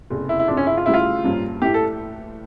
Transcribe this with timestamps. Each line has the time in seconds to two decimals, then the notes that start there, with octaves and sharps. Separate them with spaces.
0.10 F1 E2 C#3
0.29 E4
0.39 E4
0.48 G1 F2 C#3 F3 D4
0.57 C#4
0.67 E4
0.77 F4
0.86 D2 C#3 E3 G3 C#4 E4
0.94 F4
1.24 G2 F3 A#3 C#4
1.62 A2 E3 A3 E4 G4
1.74 A4